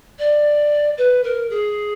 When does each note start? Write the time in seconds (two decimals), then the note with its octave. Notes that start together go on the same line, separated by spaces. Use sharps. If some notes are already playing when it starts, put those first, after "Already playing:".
0.19 D5
0.97 B4
1.23 A#4
1.50 G#4